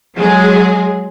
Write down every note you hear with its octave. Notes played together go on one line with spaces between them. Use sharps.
F#3 G#3 G#4